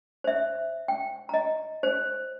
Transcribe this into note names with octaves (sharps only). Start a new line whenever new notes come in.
C5 E5
G5
D#5 A#5
C5